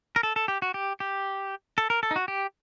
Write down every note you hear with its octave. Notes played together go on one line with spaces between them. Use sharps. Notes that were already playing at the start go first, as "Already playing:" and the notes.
A#4
A4
A4
G4
F#4
G4
G4
A4
A#4
A4
D#4
F#4
G4